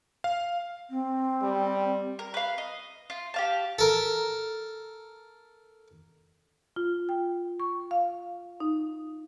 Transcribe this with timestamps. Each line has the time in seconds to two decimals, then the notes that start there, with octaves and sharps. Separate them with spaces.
0.24 F5
0.90 C4
1.43 G3
2.19 A#4
2.34 B4 F5
2.58 D#5
3.10 F4
3.34 G4 F5 A5
3.79 A4 A#4
6.76 F4
7.09 G5
7.60 C#6
7.91 F5
8.60 D#4